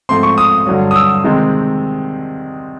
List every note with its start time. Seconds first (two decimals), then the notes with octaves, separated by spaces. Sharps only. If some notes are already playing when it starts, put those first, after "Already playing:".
0.09 G#2 F3 A3 C4 C6
0.23 C#6
0.38 D#6
0.67 G2 D3 F#3
0.91 D#6
0.96 E6
1.24 C3 D#3 G#3 C4